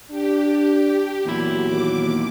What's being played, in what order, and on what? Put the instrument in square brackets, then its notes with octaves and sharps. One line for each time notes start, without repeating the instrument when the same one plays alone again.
[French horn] D4 [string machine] G4
[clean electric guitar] E2 A#2 E4 [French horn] F#3
[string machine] D#2 D6